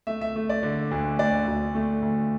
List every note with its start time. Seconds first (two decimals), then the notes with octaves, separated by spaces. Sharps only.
0.07 A3 E5
0.21 E5
0.36 A3
0.49 D5
0.63 D3
0.91 D2
1.19 D2 D5
1.47 D2
1.75 A3
2.02 D2